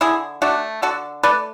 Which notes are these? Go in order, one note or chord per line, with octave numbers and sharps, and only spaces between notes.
D3 E4 G#4
A3 D4 F#4
D3 F#4 A4
A3 B4 D5